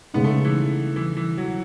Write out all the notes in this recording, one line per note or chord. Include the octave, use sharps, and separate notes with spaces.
C#3 G#3 B3 D#4
A3
E3
E3
E3
F#3